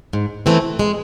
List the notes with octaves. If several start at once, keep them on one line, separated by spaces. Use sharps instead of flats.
G#2
E3 A3 C4
G#3